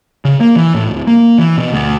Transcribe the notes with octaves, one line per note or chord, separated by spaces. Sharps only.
C#3
A#3
E3
A2
D1
A#3
E3
B2
D2